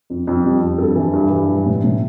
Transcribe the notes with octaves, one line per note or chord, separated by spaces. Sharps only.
F2
F2
G3
F2
G2 A4
E3
G2
E3
G3
A2
A2